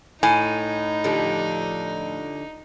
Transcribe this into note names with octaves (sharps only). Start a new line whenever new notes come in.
A2 D#4 G#5
D3 F3 G4